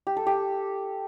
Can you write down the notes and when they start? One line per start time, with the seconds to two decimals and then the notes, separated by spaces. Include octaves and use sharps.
0.07 G4
0.17 A4
0.27 G4